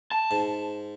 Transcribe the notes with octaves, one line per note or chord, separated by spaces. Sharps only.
A5
G#2